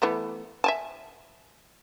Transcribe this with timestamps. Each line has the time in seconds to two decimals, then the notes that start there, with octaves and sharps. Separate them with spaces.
0.02 E3 A3 B3
0.64 E5 G#5 A5